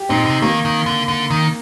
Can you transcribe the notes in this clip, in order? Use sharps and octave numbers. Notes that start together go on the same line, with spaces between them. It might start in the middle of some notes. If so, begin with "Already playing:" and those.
Already playing: G4
A#2 C4 D#4
C3
D#3 A#3
D#3
D3
D3
D#3